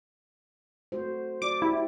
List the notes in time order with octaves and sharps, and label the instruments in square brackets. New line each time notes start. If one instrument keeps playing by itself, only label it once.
[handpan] A3 F#4 C5
[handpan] F#4 D5 [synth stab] D6
[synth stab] E4 [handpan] G4